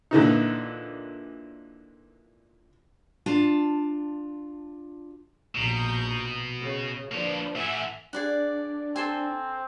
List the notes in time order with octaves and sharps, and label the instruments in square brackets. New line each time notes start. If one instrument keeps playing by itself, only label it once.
[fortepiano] A#2 D3 E3 D#4
[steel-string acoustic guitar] D4 F4 A5
[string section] A#1 A#5 G6 [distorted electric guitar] B2
[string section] C#3
[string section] F3 D4 B4 [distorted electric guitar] A#3 C#5
[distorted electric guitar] E3 A3 [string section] E5 F#5 G#5
[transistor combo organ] D4 [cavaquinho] G#4 D5 F#5
[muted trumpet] C4 [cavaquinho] A4 C5 G#5